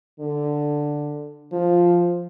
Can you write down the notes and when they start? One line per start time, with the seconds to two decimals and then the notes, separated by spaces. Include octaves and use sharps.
0.20 D3
1.52 F3